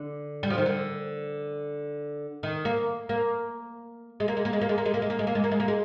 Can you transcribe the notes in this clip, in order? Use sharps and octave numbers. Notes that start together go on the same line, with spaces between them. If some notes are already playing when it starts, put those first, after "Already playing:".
Already playing: D3
G3
F3
D#3
D3
D#3
A#3
A#3
G#3
A#3
G#3
A#3
G#3
A#3
G#3
A#3
G#3
A#3
G#3
A#3
G#3
A#3
G#3
A#3
G#3
A#3
G#3